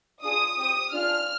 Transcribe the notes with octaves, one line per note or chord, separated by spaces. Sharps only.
D4 F4 G#4 D#6
C4 G4 D#6
D4 F4 G#4 F6